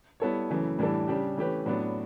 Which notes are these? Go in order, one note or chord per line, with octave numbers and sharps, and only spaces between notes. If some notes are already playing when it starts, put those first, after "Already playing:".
G3 B3 E4 A4 C#5
F#2 C#3 E3 A3
A2 E3 G3 D4 A4
C#3 G3 D4 G4
E3 A3 C#4 G4 B4
A2 F#3 B3 D4